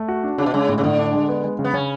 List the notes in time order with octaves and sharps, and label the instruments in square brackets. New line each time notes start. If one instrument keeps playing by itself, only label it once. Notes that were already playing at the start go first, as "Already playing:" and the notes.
Already playing: [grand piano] A3
F#4
D4
[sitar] C#3 [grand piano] D4
[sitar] B2
[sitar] C#3 [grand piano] G#3
[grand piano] A2
[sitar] C#3
[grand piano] A2 [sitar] D3
[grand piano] D4
G#3
B3
G#3
C#3
[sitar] B3
[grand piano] C#3 [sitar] C#4